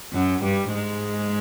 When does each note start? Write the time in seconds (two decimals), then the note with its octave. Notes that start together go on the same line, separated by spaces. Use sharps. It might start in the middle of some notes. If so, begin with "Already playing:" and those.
0.13 F#2 F#3
0.44 G2 G3
0.74 G#2 G#3